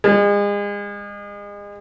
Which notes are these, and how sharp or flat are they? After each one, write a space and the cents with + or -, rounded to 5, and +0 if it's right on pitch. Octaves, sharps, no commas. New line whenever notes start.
G#3 -35